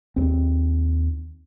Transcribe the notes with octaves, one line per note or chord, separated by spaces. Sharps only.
D#2 C4